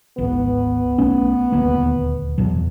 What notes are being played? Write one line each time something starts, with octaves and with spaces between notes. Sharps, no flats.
D1 G#1 B3
B1 A3 C#4
D#1 D2 A#3
E2 B2 F#3